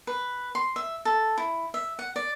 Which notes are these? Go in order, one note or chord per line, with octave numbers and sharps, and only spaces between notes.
B4
C6
E5
A4
E4
E5
F#5
D5